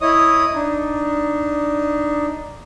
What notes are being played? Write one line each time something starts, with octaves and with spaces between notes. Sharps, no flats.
E4 C#5 D#5 D#6
D4 D#4